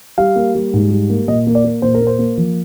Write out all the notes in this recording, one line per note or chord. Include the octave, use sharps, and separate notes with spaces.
G3 F5
A#3
G3
G#2
G3
A#3
A#2 D#5
A#3
D5
A#3
A#2 C5
A#4
A#3
C5
A#3
F3